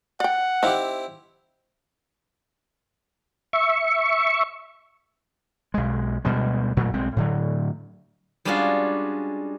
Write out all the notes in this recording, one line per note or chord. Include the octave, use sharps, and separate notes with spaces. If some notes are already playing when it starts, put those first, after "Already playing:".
D5 F#5 G5
C4 D#4 E4 G4 F5
E5 C#6
B1 G#3
D2 B2 G3 G#3
A1 A#2 F#3 A3
B1 G#3 C4
A2 D3 F#3
G3 G#3 C#4 D4 F4 F#4